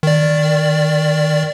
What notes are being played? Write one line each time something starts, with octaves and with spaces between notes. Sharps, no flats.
D#3 D5